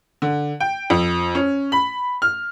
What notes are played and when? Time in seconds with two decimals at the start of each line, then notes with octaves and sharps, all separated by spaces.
0.22 D3
0.60 G5
0.90 F2
1.35 C#4
1.72 B5
2.22 F6